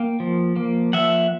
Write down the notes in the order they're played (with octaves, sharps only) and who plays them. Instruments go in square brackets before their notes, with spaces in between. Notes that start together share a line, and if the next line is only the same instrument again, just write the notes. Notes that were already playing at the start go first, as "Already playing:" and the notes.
Already playing: [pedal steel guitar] A#3 F5 G5
F3
A#3
F3 E5 F#5